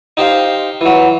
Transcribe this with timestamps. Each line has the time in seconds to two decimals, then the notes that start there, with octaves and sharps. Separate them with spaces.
0.17 D#4 G4 C5 F5
0.81 E3 F#3